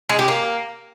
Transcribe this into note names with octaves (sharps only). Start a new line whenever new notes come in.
G#3
G4
A#3